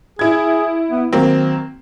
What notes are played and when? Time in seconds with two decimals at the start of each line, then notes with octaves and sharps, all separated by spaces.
0.19 E4 G#4 G#6
0.91 B3
1.13 D#3 F#3 A#3 C4